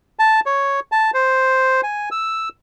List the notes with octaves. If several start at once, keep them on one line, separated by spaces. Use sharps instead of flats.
A5
C#5
A5
C5
G#5
E6